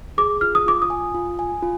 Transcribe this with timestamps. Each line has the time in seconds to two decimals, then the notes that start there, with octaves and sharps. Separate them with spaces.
0.18 G#4 D6
0.41 F4 F6
0.55 D#6
0.66 F4 D6
0.82 D#6
0.90 G#5
1.14 F4
1.39 G#5
1.63 F4